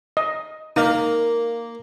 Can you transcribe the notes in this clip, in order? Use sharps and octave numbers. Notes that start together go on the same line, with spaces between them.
D#5
A#3 D#4 F5